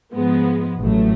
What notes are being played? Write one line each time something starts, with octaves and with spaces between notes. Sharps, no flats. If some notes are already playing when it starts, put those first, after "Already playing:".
G#2 F3 G#3 B3
A1 A2 F#3 A3